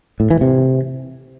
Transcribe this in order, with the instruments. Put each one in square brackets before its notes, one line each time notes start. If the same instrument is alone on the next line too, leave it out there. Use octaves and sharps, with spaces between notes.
[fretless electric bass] A2
E3
C3